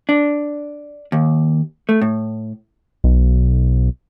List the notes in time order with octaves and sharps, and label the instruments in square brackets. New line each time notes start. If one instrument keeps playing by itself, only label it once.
[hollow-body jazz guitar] D4
D#2
A3
A2
[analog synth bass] B1